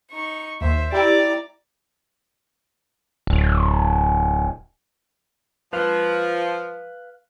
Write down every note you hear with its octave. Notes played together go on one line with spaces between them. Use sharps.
D#4 C#6
D#2 C5 E5
E4 G4 D5 A#5 D6
D1
F3 B4 F5